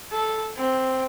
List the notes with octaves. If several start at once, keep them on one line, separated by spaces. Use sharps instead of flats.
A4
C4